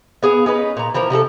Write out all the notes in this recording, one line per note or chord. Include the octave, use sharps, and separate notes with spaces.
B3 G#4 F5
C#4 D#4 B4
A#2 A#5
E3 F3 A#3 A#4
C3 F3 G4 A4